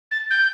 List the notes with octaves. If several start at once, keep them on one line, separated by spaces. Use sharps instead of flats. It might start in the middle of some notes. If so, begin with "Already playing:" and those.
A6
G6